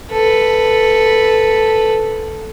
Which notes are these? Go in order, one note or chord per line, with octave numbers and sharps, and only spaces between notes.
A4 B4